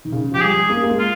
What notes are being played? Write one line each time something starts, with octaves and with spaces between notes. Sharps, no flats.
D#3
C#3
F3 G4
G3 G#4
G#3
A#3
A#3
G#3
F4